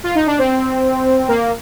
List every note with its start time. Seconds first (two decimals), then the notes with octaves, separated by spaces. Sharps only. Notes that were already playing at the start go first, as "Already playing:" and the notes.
0.04 F4
0.15 D#4
0.27 D4
0.39 C4
1.28 A#3